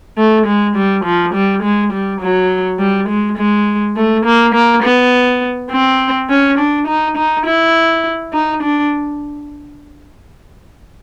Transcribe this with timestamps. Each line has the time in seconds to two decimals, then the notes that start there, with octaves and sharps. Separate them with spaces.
0.18 A3
0.46 G#3
0.76 G3
1.05 F3
1.34 G3
1.63 G#3
1.92 G3
2.21 F#3
2.79 G3
3.09 G#3
3.38 G#3
3.96 A3
4.25 A#3
4.54 A#3
4.83 B3
5.71 C4
6.30 C#4
6.58 D4
6.87 D#4
7.17 D#4
7.46 E4
8.33 D#4
8.63 D4